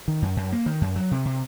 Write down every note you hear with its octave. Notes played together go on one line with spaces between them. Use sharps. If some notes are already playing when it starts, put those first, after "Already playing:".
D#3
F#2
F#2
A#3
D#3
F#2
F#3
C3
C3